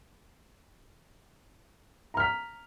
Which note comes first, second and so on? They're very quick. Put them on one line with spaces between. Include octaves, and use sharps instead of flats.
A#5 F6 B6